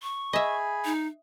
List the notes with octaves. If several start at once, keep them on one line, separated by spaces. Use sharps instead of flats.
C#6
G#4 D#5 E5 G#5 B5
D#4